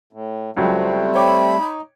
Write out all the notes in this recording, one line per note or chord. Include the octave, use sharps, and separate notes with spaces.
A2
C#2 F#3 G3 A3 C4
C#5 G5 B5 D6
D#4